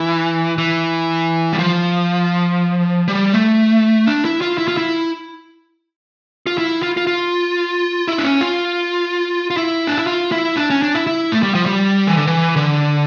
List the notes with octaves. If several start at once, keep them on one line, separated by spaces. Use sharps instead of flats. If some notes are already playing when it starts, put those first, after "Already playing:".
Already playing: E3
E3
G3
F3
G3
A3
D4
E4
F4
E4
F4
E4
F4
E4
F4
F4
F4
E4
D4
C#4
F4
F4
E4
D4
E4
F4
E4
D4
C#4
D4
E4
E4
A3
G3
F3
G3
E3
D3
E3
D3